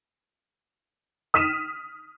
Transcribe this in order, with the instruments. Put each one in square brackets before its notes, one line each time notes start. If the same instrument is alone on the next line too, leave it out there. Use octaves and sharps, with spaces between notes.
[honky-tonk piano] D#6 F6 B6 D#7 E7